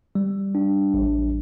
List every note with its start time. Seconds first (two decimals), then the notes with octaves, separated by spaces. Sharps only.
0.15 G3
0.55 D4
0.94 A1